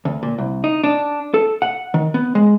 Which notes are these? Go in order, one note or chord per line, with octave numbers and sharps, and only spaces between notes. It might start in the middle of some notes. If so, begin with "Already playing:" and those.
D2
A#2
C2
D#4
D4
A4
F#5
D#3
B3
G#3